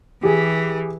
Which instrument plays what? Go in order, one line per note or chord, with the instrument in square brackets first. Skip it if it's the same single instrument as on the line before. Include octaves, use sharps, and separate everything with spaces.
[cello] E3 [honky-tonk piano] G4 G#4